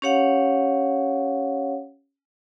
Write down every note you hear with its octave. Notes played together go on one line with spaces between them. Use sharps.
C#4 G4 C#5 F5 F#5